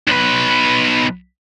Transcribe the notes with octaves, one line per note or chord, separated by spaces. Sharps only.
B1 B4